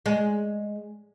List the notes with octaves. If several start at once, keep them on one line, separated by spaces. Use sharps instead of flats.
G#3